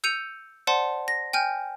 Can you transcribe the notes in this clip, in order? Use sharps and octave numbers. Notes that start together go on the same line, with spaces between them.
E6 G6 C#7 D#7 F7
C5 D5 F#5 A5 C6
A#6
G5 G#5 F6 G6